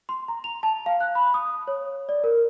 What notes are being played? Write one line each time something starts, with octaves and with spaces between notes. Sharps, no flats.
C6
A#5
F7
A5
F5
F#6
B5
D#6
C#5
D5
A#4